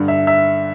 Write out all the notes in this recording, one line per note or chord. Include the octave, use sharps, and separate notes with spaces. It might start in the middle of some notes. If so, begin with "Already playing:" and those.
Already playing: G2 D3
E5
E5